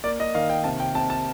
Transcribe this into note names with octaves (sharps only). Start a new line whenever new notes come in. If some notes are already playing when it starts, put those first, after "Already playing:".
A#3 D5
D#5
D#3 F5
G5
C3 A5
G5
C3 A5
A5